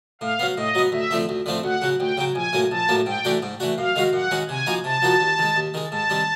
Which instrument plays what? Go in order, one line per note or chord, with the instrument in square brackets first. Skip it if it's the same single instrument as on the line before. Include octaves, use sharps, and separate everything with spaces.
[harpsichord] A2 [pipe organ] F5
[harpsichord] F#3 B3
[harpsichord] A2 [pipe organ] D#5
[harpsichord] F#3 B3
[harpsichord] D2 [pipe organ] E5
[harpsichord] D3 F3 A3 C4
D2
D3 F3 A3 C4
[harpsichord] D2 [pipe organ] F#5
[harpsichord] C#3 F#3
[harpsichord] D2 [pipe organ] G5
[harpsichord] C#3 F#3
[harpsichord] A#1 [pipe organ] G#5
[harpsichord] A2 F#3 A#3
[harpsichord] A#1 [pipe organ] A5
[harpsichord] A2 F#3 A#3
[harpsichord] G#2 [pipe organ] G5
[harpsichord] E3 A3 D4 F#4
G#2
E3 A3 D4 F#4
[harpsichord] F#2 [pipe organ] F5
[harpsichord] D#3 G#3 C#4 F#4
[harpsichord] F#2 [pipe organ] F#5
[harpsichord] D#3 G#3 C#4 F#4
[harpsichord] C3 [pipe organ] G#5
[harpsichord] F3 A#3 D#4 F#4
[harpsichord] C3 [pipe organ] A5
[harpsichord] F3 A#3 D#4 F#4
D#2
D#3 G#3
D#2
D#3 G#3
[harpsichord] G#2 [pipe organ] A5
[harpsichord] D#3 G3 C4